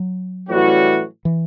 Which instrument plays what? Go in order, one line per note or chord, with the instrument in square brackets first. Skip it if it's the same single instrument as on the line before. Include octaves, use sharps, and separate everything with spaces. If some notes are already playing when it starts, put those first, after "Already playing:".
Already playing: [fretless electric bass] F#3
[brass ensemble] A2 E3 G3 C#4 F#4
[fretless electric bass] E3